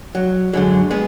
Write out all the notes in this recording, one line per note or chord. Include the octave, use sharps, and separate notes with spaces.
F#3
F#2 D3 F#3 G#3
G#3 B3